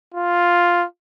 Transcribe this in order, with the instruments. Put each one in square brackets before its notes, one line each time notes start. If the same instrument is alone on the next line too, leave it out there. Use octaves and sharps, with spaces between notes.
[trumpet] F4